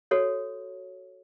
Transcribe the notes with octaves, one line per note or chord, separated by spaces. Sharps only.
F#4 A4 C#5